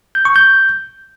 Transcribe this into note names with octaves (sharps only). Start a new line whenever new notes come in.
G6
C#6
G6